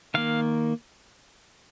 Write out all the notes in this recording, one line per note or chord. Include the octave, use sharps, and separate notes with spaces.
D#3 A#3 F5